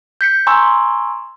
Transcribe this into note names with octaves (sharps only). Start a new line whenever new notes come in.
G6 B6 C#7
G#5 A#5 C6 C#6 E6